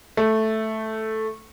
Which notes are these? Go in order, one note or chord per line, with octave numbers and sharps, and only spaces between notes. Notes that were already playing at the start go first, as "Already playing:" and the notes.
A3